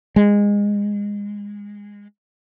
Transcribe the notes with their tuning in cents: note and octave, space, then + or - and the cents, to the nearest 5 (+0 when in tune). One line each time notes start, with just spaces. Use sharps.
G#3 -20